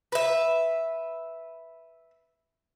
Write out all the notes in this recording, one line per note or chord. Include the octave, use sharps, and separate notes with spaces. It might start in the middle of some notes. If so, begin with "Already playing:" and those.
B4 E5